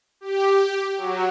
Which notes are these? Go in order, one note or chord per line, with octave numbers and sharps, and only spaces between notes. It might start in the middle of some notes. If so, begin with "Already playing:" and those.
G4
F#3